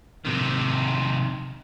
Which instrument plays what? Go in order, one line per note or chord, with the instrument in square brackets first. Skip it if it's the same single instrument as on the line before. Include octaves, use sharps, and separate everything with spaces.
[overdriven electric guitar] C3 D#3